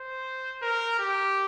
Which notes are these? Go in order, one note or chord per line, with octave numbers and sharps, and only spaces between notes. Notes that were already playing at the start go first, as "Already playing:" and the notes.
Already playing: C5
A#4
G4